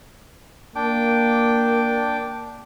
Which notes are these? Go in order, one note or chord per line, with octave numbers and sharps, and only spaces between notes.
A#3 D4 G5 D6